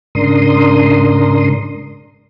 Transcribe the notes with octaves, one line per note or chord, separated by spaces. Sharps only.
G#2 C#3 D4 A#4 C6 D#6